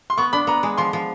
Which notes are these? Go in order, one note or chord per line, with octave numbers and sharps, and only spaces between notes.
C6
B3 C#6
D4 B5
B3 A#5
G#3
F3 C6
F3